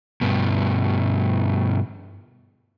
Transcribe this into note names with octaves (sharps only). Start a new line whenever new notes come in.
G2 B2